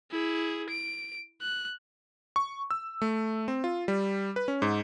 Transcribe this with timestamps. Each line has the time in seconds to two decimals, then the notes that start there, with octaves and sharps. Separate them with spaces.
0.12 E4 G#4
0.70 D7
1.41 F#6
2.36 C#6
2.71 E6
3.02 A3
3.48 C4
3.64 F4
3.88 G3
4.36 B4
4.48 C#4
4.62 G#2